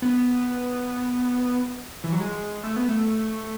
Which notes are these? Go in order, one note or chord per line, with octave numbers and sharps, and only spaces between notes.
B3
E3
F#3
G#3
A3
B3
A3